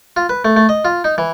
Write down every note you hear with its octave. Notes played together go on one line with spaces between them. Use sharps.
F4
B4
A3
A3
D#5
F4
D#4
E3